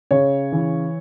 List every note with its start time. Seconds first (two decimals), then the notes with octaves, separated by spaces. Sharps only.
0.11 C#3 C#5
0.52 E3